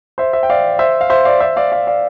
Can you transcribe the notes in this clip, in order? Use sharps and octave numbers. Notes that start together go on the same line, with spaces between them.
C5 E5
C5 E5
G5
D5 F5
C5 E5
F5
C5 E5
D5 F5
C5 E5
D5 F5
D5 F5
D5 F5